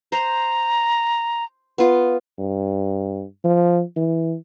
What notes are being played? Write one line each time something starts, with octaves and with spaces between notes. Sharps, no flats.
C5 A#5
B3 F4
G2
F3
E3